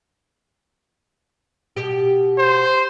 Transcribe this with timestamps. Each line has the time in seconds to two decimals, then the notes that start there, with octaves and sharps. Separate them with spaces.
1.76 B2 G4
2.38 C5